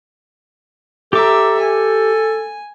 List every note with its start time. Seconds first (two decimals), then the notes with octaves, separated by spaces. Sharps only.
1.13 G4 A4 E5 A#5 D6
1.60 G#5